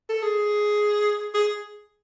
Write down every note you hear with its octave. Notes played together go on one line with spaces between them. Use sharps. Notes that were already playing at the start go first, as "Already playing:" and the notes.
A4
G#4
G#4